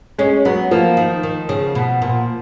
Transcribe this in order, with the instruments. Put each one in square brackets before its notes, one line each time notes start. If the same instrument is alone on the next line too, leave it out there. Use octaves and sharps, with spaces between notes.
[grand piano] G#3 [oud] C#4
[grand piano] F#3 [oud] B3
[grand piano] F3 [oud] A#3
[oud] D#3
D#3
C#3
B2
A#2